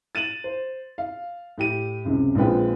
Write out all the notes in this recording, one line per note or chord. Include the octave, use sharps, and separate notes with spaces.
A6 D#7 E7 F#7
C5
F5
A2 G4 D#7
C#2 F#2 C3
A#1 G#3 C4 F4 B4 G5